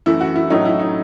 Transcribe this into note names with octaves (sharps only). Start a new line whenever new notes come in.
F#2 E3 A3 E4
F#4
E4
A2 F#3 A3 C#4 D#4
E4
D#4